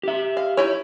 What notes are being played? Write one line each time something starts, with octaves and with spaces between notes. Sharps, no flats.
G4 E5
F5
D#4 E4 C#5